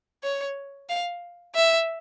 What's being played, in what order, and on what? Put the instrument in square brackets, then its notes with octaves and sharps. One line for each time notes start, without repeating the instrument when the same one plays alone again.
[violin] C#5
F5
E5